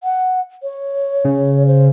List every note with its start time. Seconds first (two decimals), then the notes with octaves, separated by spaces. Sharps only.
0.03 F#5
0.63 C#5
1.25 C#3
1.67 C5